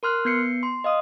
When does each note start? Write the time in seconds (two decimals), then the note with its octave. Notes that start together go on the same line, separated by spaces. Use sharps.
0.03 A#4 C6 F6 F#6
0.25 B3 G6 C7 C#7
0.63 C6
0.84 D#5 F5 D#6